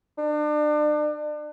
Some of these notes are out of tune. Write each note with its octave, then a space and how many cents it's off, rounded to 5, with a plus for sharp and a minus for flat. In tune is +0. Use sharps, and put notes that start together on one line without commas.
D4 +35